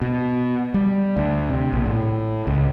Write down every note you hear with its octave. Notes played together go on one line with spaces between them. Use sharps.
B2
G3
D2
C3
A#1
A2
C#2